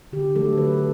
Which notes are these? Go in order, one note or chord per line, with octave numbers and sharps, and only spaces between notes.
D3 G4
F#3 A3 A4
D3 B4
A4